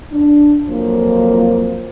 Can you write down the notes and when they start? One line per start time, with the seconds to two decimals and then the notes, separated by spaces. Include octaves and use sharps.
0.13 D4
0.68 F2 F#3 A#3 F4 C5